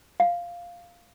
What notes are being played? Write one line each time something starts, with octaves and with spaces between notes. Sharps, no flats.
F5